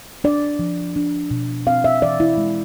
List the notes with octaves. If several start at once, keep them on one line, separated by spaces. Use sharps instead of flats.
D4 D5
F3
D4
B2
C4 F5
E5
E3 D5
E4
G#3